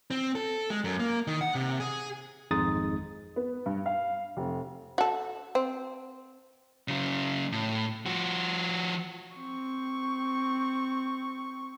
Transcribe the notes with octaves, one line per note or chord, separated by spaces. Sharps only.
C4
A4
G#3
F#2
A#3
D#3
F#5
C3
G#4
G#1 F2 G#3 D#4 D#6 A6
B3
G2
F5
F1
F#4 A4
C4
C#3 F#3
A2
F3 F#4
C4 C#6